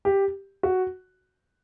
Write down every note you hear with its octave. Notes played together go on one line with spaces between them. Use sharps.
G4
F#4